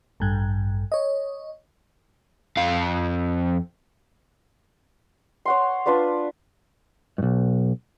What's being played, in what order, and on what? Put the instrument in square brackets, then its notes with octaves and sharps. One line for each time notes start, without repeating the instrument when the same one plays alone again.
[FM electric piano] A1 G2
C#5 D#5
[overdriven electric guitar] F2 F5
[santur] C#5 F#5 C6
D4 F4 B4 D5
[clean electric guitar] B1 G2